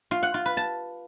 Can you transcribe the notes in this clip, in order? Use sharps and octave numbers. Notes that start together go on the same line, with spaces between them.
F4
F#5
F4
B4
A5